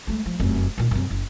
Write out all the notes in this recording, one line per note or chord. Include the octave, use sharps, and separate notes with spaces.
G#3 A3
F3
F1 F#2
A#2 D#3
F#2 C3
F#1